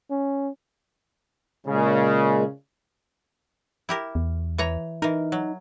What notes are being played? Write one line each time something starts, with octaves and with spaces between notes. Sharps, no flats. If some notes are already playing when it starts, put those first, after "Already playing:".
C#4
A#2 C#3 G#3
E4 G4 A#4
E2
E3 C#5 A#5
E3 D#4 A#4
F#3